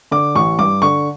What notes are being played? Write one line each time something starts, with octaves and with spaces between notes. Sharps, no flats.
D3 D6
A1 C#6
G2 D6
D3 C#6